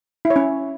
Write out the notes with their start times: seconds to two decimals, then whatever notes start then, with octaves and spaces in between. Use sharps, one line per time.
0.25 E4
0.30 C#5
0.36 C#4